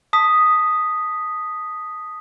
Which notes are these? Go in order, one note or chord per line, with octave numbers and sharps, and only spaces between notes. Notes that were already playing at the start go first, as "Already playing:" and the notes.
A5 D#6 B6